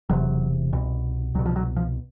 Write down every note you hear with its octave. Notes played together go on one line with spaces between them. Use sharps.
E1 E2 C3 F#3
C2 B2
C2 B2 F#3
F3
F#3
F3